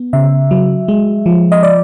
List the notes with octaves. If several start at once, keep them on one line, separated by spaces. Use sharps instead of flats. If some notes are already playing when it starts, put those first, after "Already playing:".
Already playing: B3
C#3 E5
F#3
G#3
F3
D#5
D5